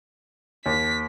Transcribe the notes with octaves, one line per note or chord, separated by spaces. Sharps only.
D#2 B6